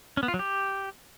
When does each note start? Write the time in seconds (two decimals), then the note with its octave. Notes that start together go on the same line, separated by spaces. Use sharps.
0.17 C#4
0.23 B3
0.28 F4
0.34 F#3
0.39 G4